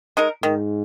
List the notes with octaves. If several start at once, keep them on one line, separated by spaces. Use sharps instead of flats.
G#3 D#4 A#4
G#2 D#3